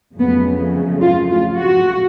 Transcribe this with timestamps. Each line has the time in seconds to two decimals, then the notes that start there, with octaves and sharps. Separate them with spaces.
0.17 F2 C#3 F#3 A3 B3
1.03 F4
1.31 F4
1.60 F#4